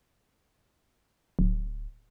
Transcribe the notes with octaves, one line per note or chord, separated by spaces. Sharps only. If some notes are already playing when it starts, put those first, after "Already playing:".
D1